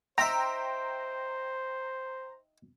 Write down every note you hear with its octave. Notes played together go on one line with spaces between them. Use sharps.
D#4 C5 E5 G5 A#5 C6